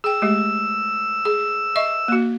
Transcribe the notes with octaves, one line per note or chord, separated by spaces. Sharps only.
G#4 G5 E6
G#3 A3 G4
G#4
D#5 E5 C#6
A#3 F#4